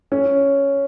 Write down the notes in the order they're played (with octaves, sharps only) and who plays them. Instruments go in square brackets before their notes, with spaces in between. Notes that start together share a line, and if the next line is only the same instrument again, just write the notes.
[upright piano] C#4